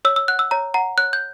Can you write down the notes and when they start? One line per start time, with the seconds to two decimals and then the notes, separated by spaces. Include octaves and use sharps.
0.05 C#5 E6
0.16 E6
0.28 F#5 F#6
0.39 E6
0.51 C#5 A#5
0.74 F#5 A#5
0.98 C#5 F#6
1.13 G6